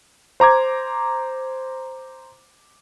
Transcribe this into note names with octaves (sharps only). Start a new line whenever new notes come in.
C5 A#5 D6 G#6